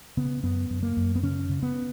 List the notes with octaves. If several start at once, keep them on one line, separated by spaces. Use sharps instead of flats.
C#3 B3
F#2 B3
F#2
A#3
F#2
B3
C#3 C#4
C#3
B3